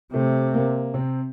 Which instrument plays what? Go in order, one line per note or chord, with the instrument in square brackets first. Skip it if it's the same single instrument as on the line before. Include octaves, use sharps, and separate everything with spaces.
[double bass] C3 [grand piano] A3
[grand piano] A#3
C3 C4